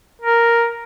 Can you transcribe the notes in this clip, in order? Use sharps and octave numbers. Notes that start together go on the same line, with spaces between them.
A#4